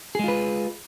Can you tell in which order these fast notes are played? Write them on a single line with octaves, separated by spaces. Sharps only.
G#4 G#3 F4 B4